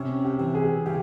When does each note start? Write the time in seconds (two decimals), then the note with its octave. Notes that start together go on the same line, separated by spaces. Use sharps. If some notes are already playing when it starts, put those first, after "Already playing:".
Already playing: C3 C#4
0.25 G4
0.39 E3
0.55 G#4
0.86 C#3 G4